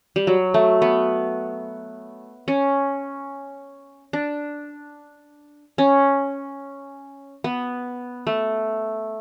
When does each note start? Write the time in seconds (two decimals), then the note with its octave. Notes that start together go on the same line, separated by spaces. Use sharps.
0.16 G3
0.27 F#3
0.54 A3
0.82 B3
2.48 C#4
4.13 D4
5.78 C#4
7.44 B3
8.27 A3